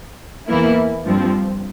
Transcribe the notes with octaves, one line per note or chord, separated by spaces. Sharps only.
E2 E3 A#3 E4
G2 F3 C4